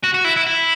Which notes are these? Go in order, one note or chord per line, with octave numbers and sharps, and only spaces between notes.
F#4
F#4
E4
E4
E4